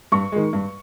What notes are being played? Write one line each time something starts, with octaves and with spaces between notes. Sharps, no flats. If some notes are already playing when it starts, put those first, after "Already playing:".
G2 C#6
D#3 G#3
G2